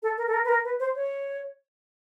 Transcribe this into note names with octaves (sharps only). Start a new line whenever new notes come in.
A4
A#4
A4
A#4
B4
A#4
B4
C5
C#5